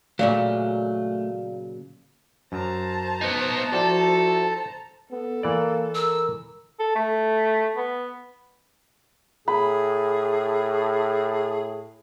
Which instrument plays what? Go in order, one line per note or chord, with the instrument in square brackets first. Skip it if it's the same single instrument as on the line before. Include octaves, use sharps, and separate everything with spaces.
[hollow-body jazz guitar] A#2 C#3 F#3 [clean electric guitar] A3 [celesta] D5 F5
[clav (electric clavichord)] F#2 [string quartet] C5 A5 A#5
[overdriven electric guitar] B3 D#4
[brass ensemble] F3 E4 F#4 [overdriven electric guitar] A4 [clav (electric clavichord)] D5 G5
[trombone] B3 [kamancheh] A4
[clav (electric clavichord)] E3 D5 [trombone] A#3
[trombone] A#4 [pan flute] E6
[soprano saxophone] A4
A3
B3
[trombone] A2 [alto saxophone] G#4 [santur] B5